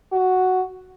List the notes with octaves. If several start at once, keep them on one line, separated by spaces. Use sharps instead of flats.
F#4